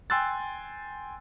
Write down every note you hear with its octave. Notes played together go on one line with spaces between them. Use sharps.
G5 G#5 C6 E6 F#6 A6